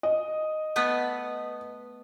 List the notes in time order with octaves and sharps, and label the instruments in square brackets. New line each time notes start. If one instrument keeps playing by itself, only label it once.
[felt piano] D#5
[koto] A3 B3 B4